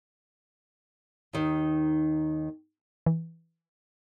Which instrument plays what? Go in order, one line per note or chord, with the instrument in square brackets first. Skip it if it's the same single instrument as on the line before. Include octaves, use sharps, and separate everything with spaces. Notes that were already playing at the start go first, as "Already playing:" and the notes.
[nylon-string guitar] D#2 D#3
[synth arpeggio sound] E3